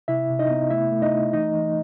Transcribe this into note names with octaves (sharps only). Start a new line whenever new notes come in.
C3 E4 E5
C3
D#4 D#5
B3
A3 E4 E5
A3
D#4 D#5
A3
E3 D#4 D#5
E3